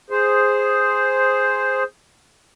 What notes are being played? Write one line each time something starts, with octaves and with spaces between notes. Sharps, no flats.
G#4 C5